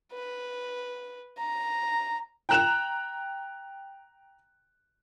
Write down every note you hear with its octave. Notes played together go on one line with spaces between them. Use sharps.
B4
A#5
G5 A#5 F#6 E7 F7